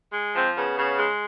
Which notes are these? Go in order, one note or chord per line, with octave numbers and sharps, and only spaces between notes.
G#3
F3 C4
C#3 B3
C#3
G#3